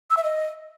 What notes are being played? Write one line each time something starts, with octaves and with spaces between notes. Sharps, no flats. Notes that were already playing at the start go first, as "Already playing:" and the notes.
E6
E5
D#5